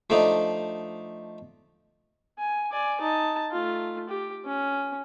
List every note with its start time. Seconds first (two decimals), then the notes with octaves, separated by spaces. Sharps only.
0.10 F3 A3 D4 D#4
2.39 G#5
2.72 D5 G#5
3.01 D#4 A5
3.51 A3 F4
4.09 G4
4.45 C#4